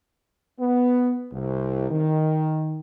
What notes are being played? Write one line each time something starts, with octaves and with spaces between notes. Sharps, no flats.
B3
C2
D#3